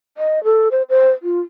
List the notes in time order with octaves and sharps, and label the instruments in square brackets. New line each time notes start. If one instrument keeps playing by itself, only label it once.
[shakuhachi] D#5
A4
C5
C5
F4